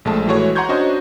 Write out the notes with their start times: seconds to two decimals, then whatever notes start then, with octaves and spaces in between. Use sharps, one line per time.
0.05 A#1 G#3 A3 A5
0.28 E3 G#3 A3 F#4 C#5
0.55 F#5 A#5 C6 C#6 G6 G#6
0.69 C#4 D4 F#4 C5 D#5